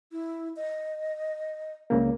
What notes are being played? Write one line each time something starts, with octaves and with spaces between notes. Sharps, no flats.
E4
D#5
C#2 C#3 A#3